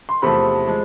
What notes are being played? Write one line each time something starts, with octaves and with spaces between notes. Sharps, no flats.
C6
E2 C3 F3 A3 B5
F3 G#3